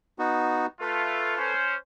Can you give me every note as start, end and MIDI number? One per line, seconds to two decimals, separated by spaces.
0.19 0.66 59
0.19 0.66 63
0.19 0.66 66
0.81 1.34 57
0.81 1.34 65
0.81 1.53 69
0.81 1.53 71
1.37 1.75 61
1.37 1.75 72